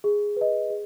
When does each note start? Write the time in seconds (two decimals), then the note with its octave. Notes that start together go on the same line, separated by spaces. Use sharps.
0.04 G#4
0.36 B4 D#5
0.70 G#4